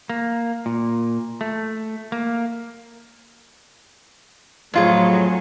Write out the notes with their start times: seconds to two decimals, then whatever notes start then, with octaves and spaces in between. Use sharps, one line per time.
0.10 A#3
0.66 A#2
1.41 A3
2.12 A#3
4.74 F2 A2 F#3 F4 G#4